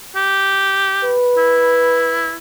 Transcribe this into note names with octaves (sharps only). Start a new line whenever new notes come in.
G4
B4
E4